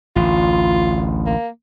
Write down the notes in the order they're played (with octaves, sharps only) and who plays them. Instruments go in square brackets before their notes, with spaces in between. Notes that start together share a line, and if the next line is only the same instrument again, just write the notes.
[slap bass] A1 D2 [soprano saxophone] F4
[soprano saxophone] A#3